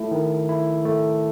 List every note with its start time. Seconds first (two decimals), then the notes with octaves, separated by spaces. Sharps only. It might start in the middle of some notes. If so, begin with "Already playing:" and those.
Already playing: A3 E4
0.11 D#3
0.49 E4
0.85 A3